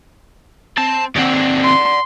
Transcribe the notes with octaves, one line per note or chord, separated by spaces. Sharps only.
C4 A5
D#2 C4 D5 F#5
C6